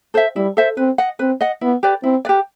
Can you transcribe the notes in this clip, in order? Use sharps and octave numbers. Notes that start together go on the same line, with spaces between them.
A4 C5 E5
G3 E4
A4 C5 E5
C4 B4
D#5 F#5
C4 B4
D#5 F#5
B3 E4
G4 B4 D5
C4 E4
G4 B4 D5